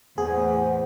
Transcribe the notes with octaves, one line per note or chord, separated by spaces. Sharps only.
E2 A2 G#4 C5 F#5